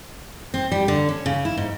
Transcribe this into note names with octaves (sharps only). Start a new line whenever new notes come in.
C4
G3
D3
C#4
C#3
E4
G#2